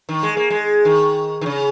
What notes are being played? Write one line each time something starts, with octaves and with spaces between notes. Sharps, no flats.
D#3
G#3
A#3
G#3
D#3
D#3
C#3